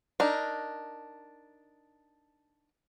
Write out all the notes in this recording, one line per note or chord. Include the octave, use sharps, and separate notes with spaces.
D4 D#4 A#4